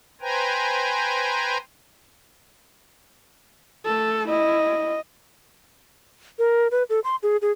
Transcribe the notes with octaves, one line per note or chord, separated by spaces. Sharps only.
B4 C5 G5 G#5 A#5
A3 A4
E4 D#5
A#4
B4
A4
C6
G#4
G#4